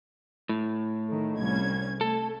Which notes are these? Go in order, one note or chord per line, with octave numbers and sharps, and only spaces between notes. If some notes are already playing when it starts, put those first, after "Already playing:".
A2
D#3 A3
C2 C#4 G#6
A3 A4